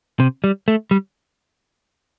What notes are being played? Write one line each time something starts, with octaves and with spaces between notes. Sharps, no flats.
C3
G3
A3
G3